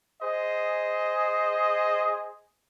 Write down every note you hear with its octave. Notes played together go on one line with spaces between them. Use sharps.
G#4 C5 D#5